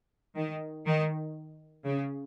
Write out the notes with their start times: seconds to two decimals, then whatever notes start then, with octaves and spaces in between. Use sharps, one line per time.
0.36 D#3
0.86 D#3
1.84 C#3